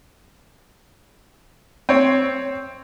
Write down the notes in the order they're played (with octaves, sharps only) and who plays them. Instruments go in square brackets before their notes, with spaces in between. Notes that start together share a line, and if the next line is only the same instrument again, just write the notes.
[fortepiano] C4 C#5